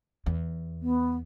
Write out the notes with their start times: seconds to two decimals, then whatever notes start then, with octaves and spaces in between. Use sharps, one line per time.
0.26 E2
0.81 B3